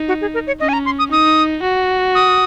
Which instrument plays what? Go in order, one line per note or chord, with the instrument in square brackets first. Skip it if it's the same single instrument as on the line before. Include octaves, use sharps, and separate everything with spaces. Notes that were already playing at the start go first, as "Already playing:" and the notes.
Already playing: [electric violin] D#4
[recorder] F#4
G#4
A#4
C#5
[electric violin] C#4 [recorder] D#5
[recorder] G#5
A#5
C6
D#6
[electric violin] D#4 [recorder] D#6
[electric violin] F#4
[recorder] D#6